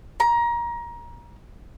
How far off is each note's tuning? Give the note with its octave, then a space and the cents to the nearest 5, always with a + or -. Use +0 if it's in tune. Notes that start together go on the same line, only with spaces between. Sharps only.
A#5 +25